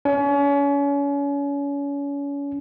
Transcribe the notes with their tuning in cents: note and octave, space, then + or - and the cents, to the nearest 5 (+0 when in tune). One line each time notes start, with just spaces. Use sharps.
C#4 +35